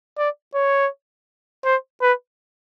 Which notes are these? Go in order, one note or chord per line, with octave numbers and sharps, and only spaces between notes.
D5
C#5
C5
B4